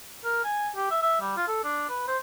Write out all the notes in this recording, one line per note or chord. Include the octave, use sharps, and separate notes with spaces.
A#4
G#5
G4
E5
E5
G3
F4
A4
D4
B4
C5